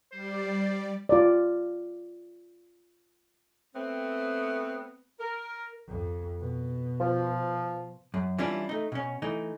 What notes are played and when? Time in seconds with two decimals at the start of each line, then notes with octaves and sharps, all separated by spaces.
0.12 G3 C5 D5
1.09 F4 D5
3.75 A3 B3 C4
5.19 A#4
5.88 F2
6.39 B2
7.01 F3
8.14 F#2
8.38 E3 G3 C#4 D4 E4 F4
8.69 A3 D#4
8.92 B2 C#4
9.22 E3 A3 D#4